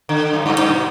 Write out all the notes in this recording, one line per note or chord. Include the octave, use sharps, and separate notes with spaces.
D3
F#2
G2
G2
B2